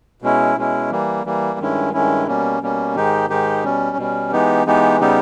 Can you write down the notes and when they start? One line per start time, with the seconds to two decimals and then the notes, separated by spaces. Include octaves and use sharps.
0.22 B2 G#3 C#4 E4
0.56 B2 G#3 C#4 E4
0.91 E3 G3 A#3
1.25 E3 G3 A#3
1.59 G2 D#3 G#3 C#4 E4
1.93 G2 D#3 G#3 C#4 E4
2.27 B2 G3 A#3 C#4
2.62 B2 G3 A#3 C#4
2.95 G#2 D#3 G#3 D#4 G4
3.30 G#2 D#3 G#3 D#4 G4
3.64 B2 G3 C#4
3.97 B2 G3 C#4
4.32 E3 G#3 B3 D#4 G4
4.66 E3 G#3 B3 D#4 G4
5.00 C#3 G3 B3 D#4 G4